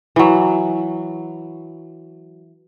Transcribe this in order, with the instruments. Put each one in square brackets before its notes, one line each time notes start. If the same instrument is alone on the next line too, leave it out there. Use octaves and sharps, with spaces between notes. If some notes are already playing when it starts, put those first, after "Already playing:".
[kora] E3 F#3